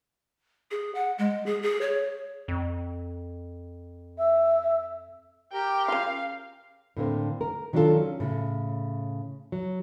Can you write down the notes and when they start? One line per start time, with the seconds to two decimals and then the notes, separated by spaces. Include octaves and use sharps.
0.71 G#4
0.95 F#5
1.18 G#3
1.46 G#4
1.62 G#4
1.81 C#5
2.48 F2
4.17 E5
5.53 G4 A#4 G5
5.88 C#3 F4 F5
6.97 A2 D3 A#3 C4
7.41 A#4
7.73 D#3 F#3 D4 E4 F4 A4
7.97 C#4
8.20 A2 C#3
9.52 F#3